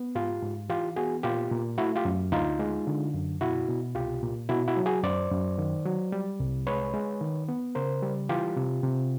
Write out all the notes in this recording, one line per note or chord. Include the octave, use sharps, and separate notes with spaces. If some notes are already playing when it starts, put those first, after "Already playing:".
Already playing: B3
G#2 F4 G4
G#2
E3 F4 G4
B3 F#4 G#4
A#2 F4 G4
A#2
A3 E4 F#4
F4 G4
F#2
D2 D#4 F4
G#3
D3
F#2
B2 E4 F#4
B2
C2 F4 G4
A#2
B2 E4 F#4
E4 F#4
F#3
F#4 G#4
F#2 C5 D5
F#2
D#3
F#3
G3
C2
G#3 B4 C#5
G#3
D#3
B3
C#3 A#4 C5
G3
E3 F4 G4
C3
C3